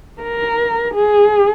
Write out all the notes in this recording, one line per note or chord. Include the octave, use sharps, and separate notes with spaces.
A#4
G#4